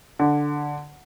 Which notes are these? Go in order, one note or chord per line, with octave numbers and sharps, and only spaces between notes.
D3